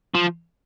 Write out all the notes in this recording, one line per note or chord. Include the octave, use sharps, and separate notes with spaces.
F3